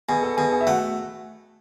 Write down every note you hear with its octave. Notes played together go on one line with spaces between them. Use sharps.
B2 G#4 G#5
A4 A5
B2 G#4 G#5
G#4 G#5
E5
A3 F#4 F#5